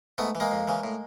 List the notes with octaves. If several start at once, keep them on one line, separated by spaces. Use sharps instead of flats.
G#2 A3 B3
E3
G#3 A#3
F2
C#3 E3
A2